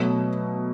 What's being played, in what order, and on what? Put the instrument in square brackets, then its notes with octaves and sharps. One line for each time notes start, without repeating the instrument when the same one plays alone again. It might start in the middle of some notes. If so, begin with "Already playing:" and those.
Already playing: [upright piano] B2 F#3 A3